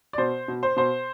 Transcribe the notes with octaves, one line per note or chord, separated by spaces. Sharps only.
D5
B2 C5
B2
C5
B2 C5